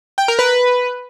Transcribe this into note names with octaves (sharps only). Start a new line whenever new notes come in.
G5
A#4
B4